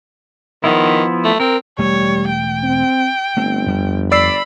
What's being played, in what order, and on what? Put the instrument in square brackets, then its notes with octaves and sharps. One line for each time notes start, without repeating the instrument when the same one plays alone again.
[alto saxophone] D#3 [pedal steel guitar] F3 B3 E4
[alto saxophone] A3
[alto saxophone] C4 [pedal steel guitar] A#4
[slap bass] E1 A3 [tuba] G3 [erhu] C#5
[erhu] G5
[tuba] C4
[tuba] G1 [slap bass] A3 C4
[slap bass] F2 G3
[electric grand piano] D5 E6 C7 [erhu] B5